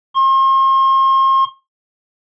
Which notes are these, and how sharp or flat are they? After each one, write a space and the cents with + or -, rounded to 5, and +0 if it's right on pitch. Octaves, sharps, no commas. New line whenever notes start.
C6 +40